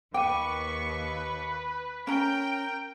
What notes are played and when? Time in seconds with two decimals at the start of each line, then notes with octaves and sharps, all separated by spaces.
0.14 D#2 B4 G5 C#6 D6 D#7
2.07 C#4 A#4 G5 A#5